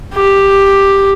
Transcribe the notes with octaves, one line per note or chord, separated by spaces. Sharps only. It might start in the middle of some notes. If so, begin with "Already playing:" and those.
G4